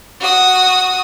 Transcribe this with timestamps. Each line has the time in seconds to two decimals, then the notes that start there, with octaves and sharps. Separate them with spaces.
0.20 F#4 D#6